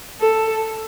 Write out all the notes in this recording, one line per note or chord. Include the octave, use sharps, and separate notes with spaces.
A4